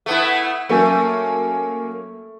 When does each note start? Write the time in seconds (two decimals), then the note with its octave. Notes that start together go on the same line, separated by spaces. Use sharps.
0.06 A3 B3 E4
0.69 F#3 A3 A#3 C#4